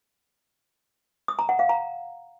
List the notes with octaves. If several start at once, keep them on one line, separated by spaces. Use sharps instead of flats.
D#6
A#5
F#5
F5
A#5